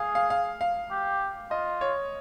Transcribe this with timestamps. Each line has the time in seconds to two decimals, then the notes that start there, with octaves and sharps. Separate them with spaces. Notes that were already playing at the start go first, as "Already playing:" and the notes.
Already playing: G#4 F5
0.15 F5
0.30 F5
0.61 F5
0.90 G4
1.51 F4 D#5
1.81 C#5